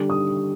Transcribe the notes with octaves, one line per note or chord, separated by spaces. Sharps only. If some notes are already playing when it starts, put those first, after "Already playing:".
Already playing: D3 G3 D4
D#6